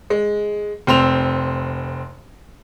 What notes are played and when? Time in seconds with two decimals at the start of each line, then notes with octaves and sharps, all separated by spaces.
0.10 G#3
0.87 F1 C4 C6 F7